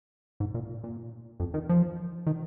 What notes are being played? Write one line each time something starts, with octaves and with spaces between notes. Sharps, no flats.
G#2
A#2
A#2
F2
D#3
F3
D#3